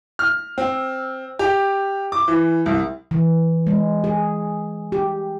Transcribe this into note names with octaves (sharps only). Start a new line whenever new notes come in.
F6
C4
G4
D6
E3
C2
E3
G#3
G#4
G4